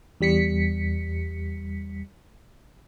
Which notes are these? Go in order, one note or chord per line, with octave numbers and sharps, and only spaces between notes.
E2 G3 B6 C#7